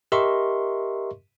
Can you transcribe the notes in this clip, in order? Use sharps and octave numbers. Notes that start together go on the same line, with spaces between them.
G4 A#4 D#5 E5 C6 C#6